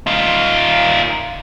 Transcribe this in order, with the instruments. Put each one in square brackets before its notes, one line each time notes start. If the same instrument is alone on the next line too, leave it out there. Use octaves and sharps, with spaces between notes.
[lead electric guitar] D#4 F4